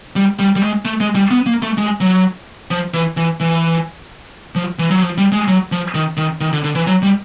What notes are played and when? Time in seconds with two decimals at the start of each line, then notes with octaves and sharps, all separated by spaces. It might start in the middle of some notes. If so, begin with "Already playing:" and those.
0.16 G3
0.39 G3
0.56 G3
0.62 G#3
0.85 A3
1.00 G#3
1.15 G3
1.31 B3
1.46 A#3
1.62 A3
1.77 G#3
2.00 F#3
2.71 F3
2.94 E3
3.17 E3
3.40 E3
4.55 F3
4.79 E3
4.91 F#3
5.02 F3
5.18 G3
5.32 G#3
5.48 F#3
5.72 F3
5.95 D#3
6.17 D#3
6.41 D#3
6.53 D3
6.64 D3
6.75 E3
6.87 F#3
7.02 G3